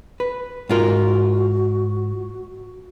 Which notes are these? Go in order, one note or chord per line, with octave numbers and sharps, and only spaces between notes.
B4
G#2 F4 F#4 A#4